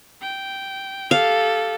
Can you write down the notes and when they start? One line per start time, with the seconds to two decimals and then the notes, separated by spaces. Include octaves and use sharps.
0.22 G5
1.11 G4 A4 F5